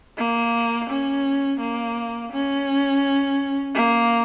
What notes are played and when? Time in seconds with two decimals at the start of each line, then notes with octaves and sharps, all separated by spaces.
0.18 A#3
0.90 C#4
1.60 A#3
2.32 C#4
3.75 A#3